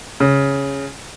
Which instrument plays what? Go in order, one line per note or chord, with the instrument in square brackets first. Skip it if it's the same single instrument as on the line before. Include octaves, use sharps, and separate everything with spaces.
[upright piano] C#3